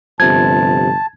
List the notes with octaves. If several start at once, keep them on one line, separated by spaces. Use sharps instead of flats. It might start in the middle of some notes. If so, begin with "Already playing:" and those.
G1 C3 F3 A5 G#6